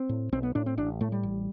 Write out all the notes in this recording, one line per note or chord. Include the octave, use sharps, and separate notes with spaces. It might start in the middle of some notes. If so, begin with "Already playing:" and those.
Already playing: C4
A2
B1 C4
B3
A2 D4
C4
A1 D4
A2 A3
G3
A1